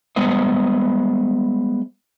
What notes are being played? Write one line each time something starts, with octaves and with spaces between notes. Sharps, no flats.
G3 G#3 B3 C5 D#5